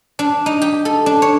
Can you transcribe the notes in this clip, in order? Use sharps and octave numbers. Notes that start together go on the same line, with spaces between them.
D4
D#4
G4
A4
D4
C#5